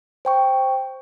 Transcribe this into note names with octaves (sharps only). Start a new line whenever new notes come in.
C5 G5 C#6